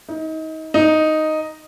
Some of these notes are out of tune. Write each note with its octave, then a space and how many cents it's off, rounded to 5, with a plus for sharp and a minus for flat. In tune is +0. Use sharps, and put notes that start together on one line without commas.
D#4 +30
D#4 +0